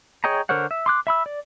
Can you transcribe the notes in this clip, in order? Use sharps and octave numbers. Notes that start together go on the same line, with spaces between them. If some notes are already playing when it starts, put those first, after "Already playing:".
G#4 C#5 D#5 G5 A#5
D3 A#4 C5 C#5 F#5
E5
C6 D6 F#6
E5 B5 E6
D5